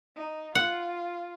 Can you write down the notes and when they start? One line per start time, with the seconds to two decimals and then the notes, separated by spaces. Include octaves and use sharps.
0.16 D#4
0.55 F4 F#5